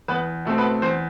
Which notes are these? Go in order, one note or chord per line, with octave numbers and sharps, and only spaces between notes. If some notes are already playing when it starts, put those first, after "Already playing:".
E2 B3 B4
B2 A3 C4
B3 B4
E2 C4 C5